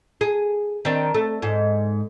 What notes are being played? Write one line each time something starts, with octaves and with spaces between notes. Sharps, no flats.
G#4
D#3 C4 D4
A3
G#2